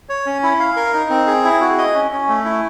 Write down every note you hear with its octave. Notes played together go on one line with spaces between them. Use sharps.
C#5
C#4
E4
F5
A#4
D#4
C4
G#4
E4
F#4
D#5
C#4
C#4
A3
E4